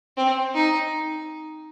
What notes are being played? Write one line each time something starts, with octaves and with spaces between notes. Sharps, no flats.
C4
D#4